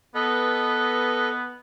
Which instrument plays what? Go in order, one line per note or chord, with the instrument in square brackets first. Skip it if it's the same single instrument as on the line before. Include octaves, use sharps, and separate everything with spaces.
[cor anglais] B3 [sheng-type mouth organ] A4 B4 D#5